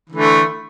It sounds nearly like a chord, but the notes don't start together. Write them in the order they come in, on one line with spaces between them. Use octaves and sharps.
E3 D3 A3